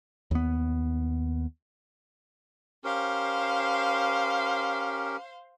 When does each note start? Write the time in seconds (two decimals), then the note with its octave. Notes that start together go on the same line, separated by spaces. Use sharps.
0.31 D#2 B3
2.84 C#4 G4 A#4 C5 F5